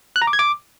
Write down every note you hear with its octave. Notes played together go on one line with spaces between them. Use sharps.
F#6
A#5
D6
G#6
D6